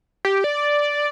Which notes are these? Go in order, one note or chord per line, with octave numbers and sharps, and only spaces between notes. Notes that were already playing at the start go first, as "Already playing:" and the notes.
G4
D5